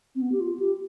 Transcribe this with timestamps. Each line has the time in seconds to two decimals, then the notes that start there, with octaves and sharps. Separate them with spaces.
0.15 C4
0.22 B3
0.32 G4
0.40 F4
0.59 G4